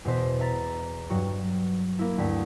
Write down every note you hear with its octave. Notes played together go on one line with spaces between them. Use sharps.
E2 B2 C5 B6
E5 A#5 A6 B6
G2 F#3 F#4
A#3 E4
D2 G2 B6